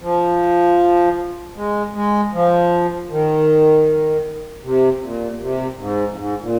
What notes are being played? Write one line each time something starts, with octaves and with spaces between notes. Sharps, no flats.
F3
G#3
G#3
F3
D#3
C3
A#2
C3
G#2
F2
G#2
A#2